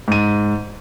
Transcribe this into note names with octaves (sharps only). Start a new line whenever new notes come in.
G#2 D#7